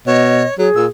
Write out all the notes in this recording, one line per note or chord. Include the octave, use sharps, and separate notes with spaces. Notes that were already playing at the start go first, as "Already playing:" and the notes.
B2 C#5 D#5
F#3 G#4
A#2 E6